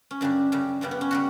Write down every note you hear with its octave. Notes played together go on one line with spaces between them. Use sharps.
C#4
F#2 C#3 G3 D4
F#2 C#3 G3
F#2 C#3 G3 B3
B3
C#4
C#3 G3 F#4